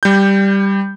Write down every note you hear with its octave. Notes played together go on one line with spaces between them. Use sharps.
G3 G6